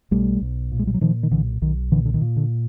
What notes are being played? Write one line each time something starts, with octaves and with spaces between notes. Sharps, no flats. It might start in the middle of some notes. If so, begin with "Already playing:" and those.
B1 G3 A3
B1
A#2
G#3
G3
F#3
A#2 D#3 F3
D#3
B1 D3 E3
B1 D#3
A#2 D3 E3
D3
D#3
A#2
D3